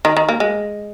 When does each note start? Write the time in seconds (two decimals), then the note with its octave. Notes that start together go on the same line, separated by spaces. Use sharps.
0.05 D#3
0.17 D#3
0.29 A#3
0.40 G#3